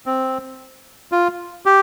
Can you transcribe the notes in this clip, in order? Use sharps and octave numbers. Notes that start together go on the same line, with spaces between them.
C4
F4
G4